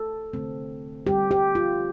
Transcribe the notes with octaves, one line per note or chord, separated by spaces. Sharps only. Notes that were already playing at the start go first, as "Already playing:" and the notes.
Already playing: A4
D3 A3 C4
D3 G3 C4 G4
G4
F4